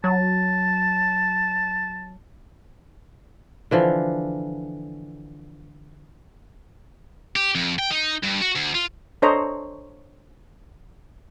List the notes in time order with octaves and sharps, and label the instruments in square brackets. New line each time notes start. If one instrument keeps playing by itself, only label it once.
[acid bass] F#3 [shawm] A5
[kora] D3 E3 F3
[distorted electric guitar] G4
F2
G5
D#4
G2
F#4
D2
F4
[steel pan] D4 A4 C5 C#5 D#5 A#5